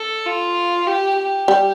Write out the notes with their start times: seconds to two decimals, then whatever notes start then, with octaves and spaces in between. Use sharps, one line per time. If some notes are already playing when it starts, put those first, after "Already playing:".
Already playing: A4
0.26 F4
0.86 G4
1.18 G4
1.48 G3